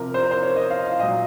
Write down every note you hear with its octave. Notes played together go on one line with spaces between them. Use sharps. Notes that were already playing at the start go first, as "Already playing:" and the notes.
Already playing: C3 F3 A#4
C5
A#4
C5
C#5
D#5
F5
F5
A#2 F#3 D#5